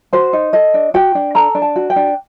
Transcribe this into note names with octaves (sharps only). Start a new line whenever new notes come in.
F#4 C5
D#4
A4 D#5
D4
F#4 G5
D4
A4 A#5
D4
A5
F#4
G5
D4